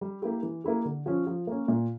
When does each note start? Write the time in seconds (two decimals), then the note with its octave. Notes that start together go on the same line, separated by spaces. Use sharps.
0.01 G3
0.22 A#3 E4 G4
0.43 E3
0.64 A#3 E4 G4
0.85 D3
1.06 F3 C#4
1.27 F3
1.47 A#3 C#4
1.68 A#2